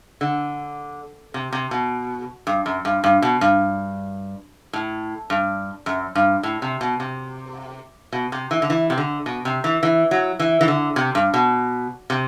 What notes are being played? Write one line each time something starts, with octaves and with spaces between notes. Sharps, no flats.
D3
C3
C3
B2
G2
F#2
G2
G2
B2
G2
A2
G2
F#2
G2
A2
C3
B2
C3
B2
C3
E3
D3
E3
C3
D3
B2
C3
E3
E3
F#3
E3
E3
D3
C3
G2
B2
C3